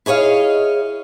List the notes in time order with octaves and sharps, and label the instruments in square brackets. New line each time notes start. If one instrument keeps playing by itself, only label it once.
[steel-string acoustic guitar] E4 G#4 C#5 D#5 F5